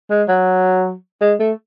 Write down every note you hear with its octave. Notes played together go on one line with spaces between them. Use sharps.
G#3
F#3
G#3
A3